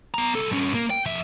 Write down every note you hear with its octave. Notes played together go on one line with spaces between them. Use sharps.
B3 A#5
C2 A4
G2 C#4
A#3
G5
F2 E5